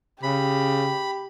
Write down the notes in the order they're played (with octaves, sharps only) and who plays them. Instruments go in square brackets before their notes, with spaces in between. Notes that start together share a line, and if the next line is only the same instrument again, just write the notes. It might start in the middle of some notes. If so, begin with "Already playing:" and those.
[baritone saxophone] C#3 [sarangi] G4 [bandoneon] B5